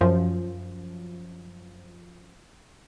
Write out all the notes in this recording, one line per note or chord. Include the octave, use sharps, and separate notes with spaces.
F#2 F3